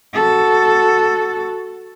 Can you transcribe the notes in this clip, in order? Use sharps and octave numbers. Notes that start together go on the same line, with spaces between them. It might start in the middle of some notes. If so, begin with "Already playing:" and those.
F#4 A4